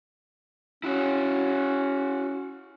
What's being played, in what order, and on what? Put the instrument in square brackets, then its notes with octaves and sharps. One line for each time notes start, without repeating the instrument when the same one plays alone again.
[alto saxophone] C#4 [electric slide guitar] E4 F#4